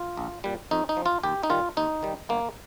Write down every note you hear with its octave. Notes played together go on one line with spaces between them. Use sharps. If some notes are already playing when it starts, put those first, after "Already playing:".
Already playing: F4
A#1
A#2 G3
F2 D#4
D#4
F3
F4
D#2 G4
D#4
D#3 G3 F4
D#2 D#4
D#3 G3
G1 A#3